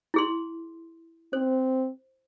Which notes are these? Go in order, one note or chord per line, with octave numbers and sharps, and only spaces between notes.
E4 G#4 C6
C4 C5